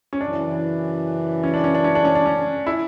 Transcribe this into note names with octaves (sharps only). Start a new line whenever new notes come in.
C#4
F#2 C#3 E3 D4
C#4
D4
C#4
D4
C#4
D4
C#4
D4
C#4
E4